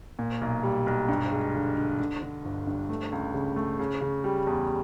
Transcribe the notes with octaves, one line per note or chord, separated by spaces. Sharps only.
A#2
B1
G3
B1
G2
G#3
D3
D3
D3
D3
G1
G2
A3
C#2
C#3
A3
C#3
C#3
G3
E2